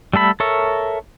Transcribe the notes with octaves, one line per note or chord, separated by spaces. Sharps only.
G3 A3 A4 B5
A4 A#4 C#5 E5